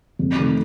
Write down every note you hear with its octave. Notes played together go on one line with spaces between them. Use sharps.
F2
C3 D#3 A3